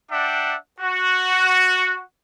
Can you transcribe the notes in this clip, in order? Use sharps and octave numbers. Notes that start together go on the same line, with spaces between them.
D4 D5 E5 F#5 G5
F#4